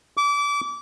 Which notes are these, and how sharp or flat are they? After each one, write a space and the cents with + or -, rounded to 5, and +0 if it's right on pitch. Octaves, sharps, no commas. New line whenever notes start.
D6 -30